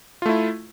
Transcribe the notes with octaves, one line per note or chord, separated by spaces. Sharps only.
A3 E4 F4